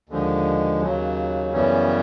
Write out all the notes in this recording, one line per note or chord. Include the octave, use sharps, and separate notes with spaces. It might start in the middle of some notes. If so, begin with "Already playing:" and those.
D#2 D3 F3 G#3
D#2 C#3 F#3
F#2 C#3 E3 G3 B3 C#4